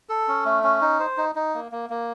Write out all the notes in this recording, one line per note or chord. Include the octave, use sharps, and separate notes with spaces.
A4
C#4
A3
C#4
D#4
C5
D#4
D#4
A#3
A#3
A#3